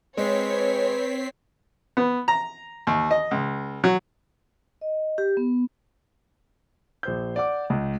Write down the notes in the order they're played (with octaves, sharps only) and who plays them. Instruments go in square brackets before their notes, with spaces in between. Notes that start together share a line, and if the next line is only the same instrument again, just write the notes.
[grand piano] G#3 [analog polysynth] C4 B6 C7 [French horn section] B4 [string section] C#5
[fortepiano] B3
A#5
D#2
D#5
C#2
F#3
[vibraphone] D#5
G4
B3
[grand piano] A#1 C5 G6
D5 F#5 D6
C#2